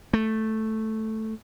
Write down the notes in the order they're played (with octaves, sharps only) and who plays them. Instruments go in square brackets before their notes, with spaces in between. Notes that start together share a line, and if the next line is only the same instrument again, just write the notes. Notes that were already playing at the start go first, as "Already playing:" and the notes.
[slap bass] A3